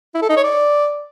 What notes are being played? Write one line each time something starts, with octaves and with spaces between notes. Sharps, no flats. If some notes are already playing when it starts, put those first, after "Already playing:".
E4
A4
D#4
C#5
D5